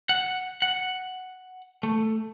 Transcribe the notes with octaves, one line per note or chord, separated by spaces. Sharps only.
F#5
F#5
A3